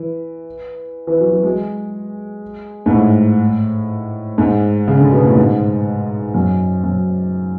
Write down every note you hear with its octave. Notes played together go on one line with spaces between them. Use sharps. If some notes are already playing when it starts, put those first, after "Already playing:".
Already playing: E3
E3
F#3
F#3
G#3
G#2
A2
G#2
C#3
D3
B2
A2
G#2
F#2
F#2